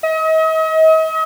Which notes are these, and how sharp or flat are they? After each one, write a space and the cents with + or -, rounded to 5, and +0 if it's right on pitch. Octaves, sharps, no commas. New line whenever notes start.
D#5 +40